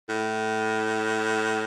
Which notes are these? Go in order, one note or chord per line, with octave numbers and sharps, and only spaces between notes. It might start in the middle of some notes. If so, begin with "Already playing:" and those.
A2